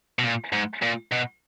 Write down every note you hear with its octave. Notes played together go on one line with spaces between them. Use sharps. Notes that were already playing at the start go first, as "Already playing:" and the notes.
B2
A#2
G#2
A#2
B2